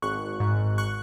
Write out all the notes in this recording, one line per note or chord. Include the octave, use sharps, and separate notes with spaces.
G#1 C#6 F#6
G#2
C#6 F#6